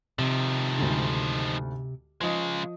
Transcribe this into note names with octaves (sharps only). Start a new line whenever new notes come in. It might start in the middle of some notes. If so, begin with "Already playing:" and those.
C3 D#3 F3
D2 G#2 D3
C#3 F3 G#3 D#5 D#6